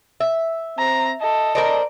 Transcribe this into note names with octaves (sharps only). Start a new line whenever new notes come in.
E5
C4 A#5
A4 D#5
A#4 C5 D5 D#5